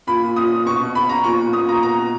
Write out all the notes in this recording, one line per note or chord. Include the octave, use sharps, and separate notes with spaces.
A#2 B5
A#2
A#2 D#6
A#2
B2 C#6
B2
B2 B5
B2 A#5
A#2 C#6
A#2
A#2 D#6
A#2 A#5
B2 A#5
B2